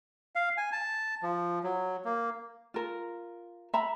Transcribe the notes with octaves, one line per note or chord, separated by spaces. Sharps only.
F5
G#5
A5
F3
F#3
A#3
F4 A#4
E5 A#5 B5